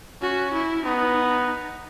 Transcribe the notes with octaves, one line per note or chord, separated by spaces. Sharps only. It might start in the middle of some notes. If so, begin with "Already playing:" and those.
C#4 F#4
E4
B3 D#4